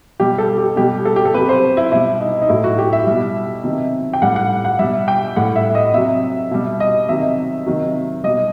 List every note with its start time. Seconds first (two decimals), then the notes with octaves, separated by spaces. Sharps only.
0.20 B2 G3 G4
0.38 A4
0.58 G4
0.76 B2 G3 G4
1.05 A4
1.16 G4
1.25 A4
1.34 C3 F#3 B4
1.49 C5
1.77 E4
1.92 B2 G3 E4
2.20 D#4
2.42 D#4
2.49 A2 F#3 E4
2.64 F#4
2.78 G4
2.93 E5
3.07 B2 G3
3.64 C3 D#3 F#3
4.13 G5
4.22 A2 G3 F#5
4.36 F#5
4.65 F#5
4.79 B2 G3 E5
5.08 G5
5.36 A2 G3 F#5
5.56 E5
5.75 D#5
5.94 C3 F#3 E5
6.51 B2 G3 E5
6.80 D#5
7.09 C3 D#3 F#3 E5
7.66 C3 D#3 F#3
8.24 B2 G3 D#5